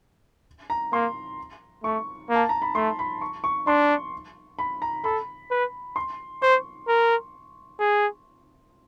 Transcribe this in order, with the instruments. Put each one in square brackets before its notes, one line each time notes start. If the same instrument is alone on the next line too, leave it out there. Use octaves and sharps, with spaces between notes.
[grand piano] A#5
[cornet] A#3 [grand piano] C6
[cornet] A3 [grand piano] C#6
[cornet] A#3
[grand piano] A5
A#5
B5
[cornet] A3 [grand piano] C6
[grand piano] B5
C#6
C#6
[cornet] D4 [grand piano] C6
[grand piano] B5
A#5
[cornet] A4 [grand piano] B5
[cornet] B4
[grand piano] C6
[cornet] C5 [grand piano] C#6
[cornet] A#4
G#4